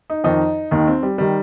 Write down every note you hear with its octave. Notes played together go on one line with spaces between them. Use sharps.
D#4
F2 D#3 D#4
D#2 D#3 D#4
C4
G3
D#3 G3